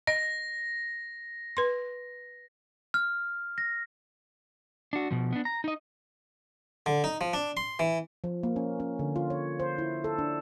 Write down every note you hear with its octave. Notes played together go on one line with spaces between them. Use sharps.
D#5 A#6
B4 C6
F6
A#6
D4 F#4
B2 F3
B3 D4
A#5
D#4 D#5
D3
D#4
F3
D4
C6
E3
F3
A#3
C#4
C#4
D3
F4
C#5
C5
E4
A4
D4